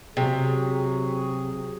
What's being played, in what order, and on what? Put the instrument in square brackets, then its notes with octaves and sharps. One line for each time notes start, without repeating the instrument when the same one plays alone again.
[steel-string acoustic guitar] C3 [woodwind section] F#3 F#4 G#4